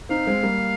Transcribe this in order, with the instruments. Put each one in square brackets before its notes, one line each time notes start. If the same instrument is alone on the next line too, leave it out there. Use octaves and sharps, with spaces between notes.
[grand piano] C4 D#4 [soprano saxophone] F5
[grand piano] G#3 C4
G3 A#3